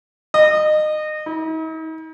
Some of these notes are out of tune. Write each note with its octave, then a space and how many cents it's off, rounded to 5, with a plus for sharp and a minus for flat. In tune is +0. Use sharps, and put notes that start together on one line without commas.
D#5 -25
D#4 +45